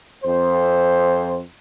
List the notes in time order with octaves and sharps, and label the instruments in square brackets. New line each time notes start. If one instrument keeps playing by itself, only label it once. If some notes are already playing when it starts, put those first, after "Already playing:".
[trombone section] F2 C5